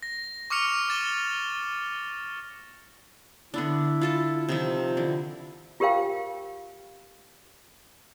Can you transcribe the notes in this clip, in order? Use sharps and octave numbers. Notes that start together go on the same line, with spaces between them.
A#6
C#6 D6 F6 C#7 F7
D6 A6 E7 G7
D3 B3 D4 E4
F4 A4 A5
C3 D#3 F3
D3 E3
F4 G4 A#4 C5 F5 G5